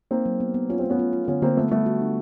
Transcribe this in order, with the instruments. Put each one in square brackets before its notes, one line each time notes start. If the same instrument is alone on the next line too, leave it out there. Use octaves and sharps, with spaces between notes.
[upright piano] A#3 C4 [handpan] D#4
[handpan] F#3
B3
B3
[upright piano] C#4 [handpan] F4
[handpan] A3 [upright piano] C4
[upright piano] B3 C#4
[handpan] F4
F4
[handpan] D3 [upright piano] B3 C#4
[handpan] D3 [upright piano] A#3 C4
[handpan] D3 [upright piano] A3 B3
[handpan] G3 [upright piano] A3 B3
[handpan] F#4
D4